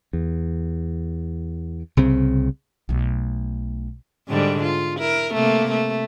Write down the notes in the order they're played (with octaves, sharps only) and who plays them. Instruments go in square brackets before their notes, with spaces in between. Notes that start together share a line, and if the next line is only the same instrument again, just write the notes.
[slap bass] E2
C2 C#3 C4
[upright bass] B1 A3
[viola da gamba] G#2 D3 G3
F4
E4 A#4
C3 A3 A#3
A3